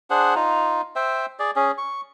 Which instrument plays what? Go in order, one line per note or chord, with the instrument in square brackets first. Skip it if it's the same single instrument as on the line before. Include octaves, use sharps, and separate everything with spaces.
[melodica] D4 G#4 C5 F#5
D#4 F4
C5 E5 G5
G#4 D5
C#4 G#4
C#6